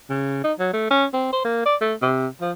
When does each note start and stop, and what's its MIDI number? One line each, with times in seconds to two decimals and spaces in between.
0.09 0.42 49
0.44 0.53 63
0.59 0.70 54
0.73 0.89 57
0.90 1.06 61
1.13 1.29 60
1.33 1.43 72
1.44 1.62 58
1.65 1.76 74
1.81 1.94 57
2.01 2.27 48
2.41 2.52 53